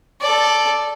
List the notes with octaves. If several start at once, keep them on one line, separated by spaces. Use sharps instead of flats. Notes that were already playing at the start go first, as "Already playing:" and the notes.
A4 D5